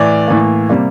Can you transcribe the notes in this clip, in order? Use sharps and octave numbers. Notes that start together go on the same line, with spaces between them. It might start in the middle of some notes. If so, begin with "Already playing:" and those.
Already playing: A2 E3 D5
A2 E3 A#3
C3 G3 A#3